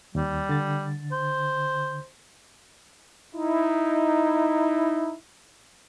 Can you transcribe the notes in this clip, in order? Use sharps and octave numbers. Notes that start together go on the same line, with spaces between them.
D#2 G3
D3 A6
C5
D#4 E4